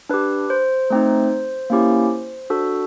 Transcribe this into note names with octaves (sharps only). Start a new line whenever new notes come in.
D4 G4 B4
C5
A3 C4 D#4
A#3 C#4 E4 G4
D4 F#4 A4